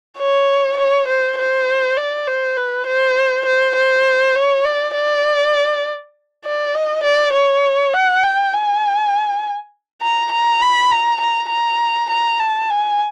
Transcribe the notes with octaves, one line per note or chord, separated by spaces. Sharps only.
C#5
C#5
C5
C5
D5
C5
B4
C5
C5
C5
C#5
D5
D5
D5
D#5
D5
C#5
F#5
G5
G#5
A#5
A#5
B5
A#5
A#5
A#5
A#5
A5
G#5